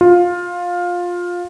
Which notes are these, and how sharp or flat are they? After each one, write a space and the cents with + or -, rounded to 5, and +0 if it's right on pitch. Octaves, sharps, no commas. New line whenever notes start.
F4 +15